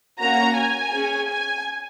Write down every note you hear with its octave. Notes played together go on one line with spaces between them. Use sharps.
A#3 C#4 F#4 A#5
G#5
C#4 G#4
G#5